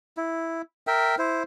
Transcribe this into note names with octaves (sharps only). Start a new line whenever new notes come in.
E4
A#4 E5 G5
E4 C5